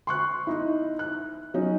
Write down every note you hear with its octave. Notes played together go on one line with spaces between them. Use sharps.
C6 C#6 F#6
D#4 E4
F#6
F#3 C#4 D#4